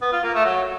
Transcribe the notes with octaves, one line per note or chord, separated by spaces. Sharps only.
B3
F4
A#3
A3
F#3